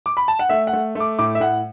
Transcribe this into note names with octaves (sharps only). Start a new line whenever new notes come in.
D6
B5
A5
F#5
A3 E5
F#5
A3
A3
D6
A2 D6
E5
A2 F#5